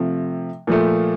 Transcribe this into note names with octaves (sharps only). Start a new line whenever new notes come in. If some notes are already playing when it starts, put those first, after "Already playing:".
Already playing: C3 F3 A3
A#2 F3 A3